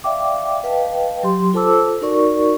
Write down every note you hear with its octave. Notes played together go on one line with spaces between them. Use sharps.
D5 E5 F5 G5 D6
B4 D#5 F5 G5 A5
F#3 G4 C6
F4 A4 C5 A5 D6 E6
D#4 F#4 A#4 D5 C#6